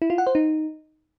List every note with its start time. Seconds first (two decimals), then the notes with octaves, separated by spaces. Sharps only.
0.02 E4
0.10 F4
0.18 F#5
0.27 C5
0.35 D#4